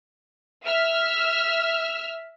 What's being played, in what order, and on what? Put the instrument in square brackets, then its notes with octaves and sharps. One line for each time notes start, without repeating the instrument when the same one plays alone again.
[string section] E5 E6 F6